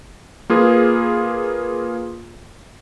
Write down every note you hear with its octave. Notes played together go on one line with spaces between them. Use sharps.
A#3 F4 G#4 B4